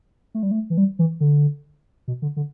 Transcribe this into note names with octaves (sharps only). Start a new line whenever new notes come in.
A3
G3
A3
E3
G3
E3
D3
B2
D3
D3